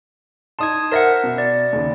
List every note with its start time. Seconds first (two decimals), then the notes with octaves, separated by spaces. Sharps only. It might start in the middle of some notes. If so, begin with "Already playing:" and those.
0.59 D#4 A5 C6 D#6 G#6
0.92 A#4 C5 E5 F#5 A#6
1.24 B2
1.38 D5
1.73 D#2 C#3